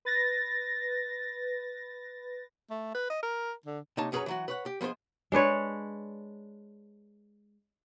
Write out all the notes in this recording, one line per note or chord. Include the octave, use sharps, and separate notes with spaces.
B4 A6 A#6
A3
B4
D#5
A#4
D3
C3 A#3 D#4 C#5 A5
F#2 C#4 G#4 B4 C#5 A#5
E3 F#3 F#4
B4 C#5 F#5
G4
F3 B3 G#4 C5 D#5
G#3 D4 B4 C#5